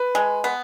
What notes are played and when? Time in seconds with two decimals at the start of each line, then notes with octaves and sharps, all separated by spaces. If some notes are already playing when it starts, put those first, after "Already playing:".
Already playing: B4
0.15 G#3
0.44 B3